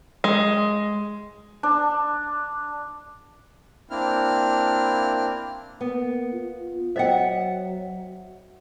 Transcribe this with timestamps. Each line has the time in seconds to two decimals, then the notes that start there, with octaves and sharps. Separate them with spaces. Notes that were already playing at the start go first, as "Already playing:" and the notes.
0.24 G#3
1.63 D4
3.90 A#3 C4 D4 E4 F6
5.81 A#3 B3
6.33 F4
6.96 F#3 C5 D#5 E5 F#5 G5